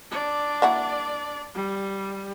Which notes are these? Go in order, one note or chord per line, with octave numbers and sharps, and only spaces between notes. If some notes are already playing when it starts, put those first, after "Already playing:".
D4 D5
A#3 E4 F#4
G3